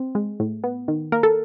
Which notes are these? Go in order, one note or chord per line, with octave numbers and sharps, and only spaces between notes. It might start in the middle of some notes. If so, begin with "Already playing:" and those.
Already playing: C4
G#3
A2
B3
D#3
A#3 A#4
A4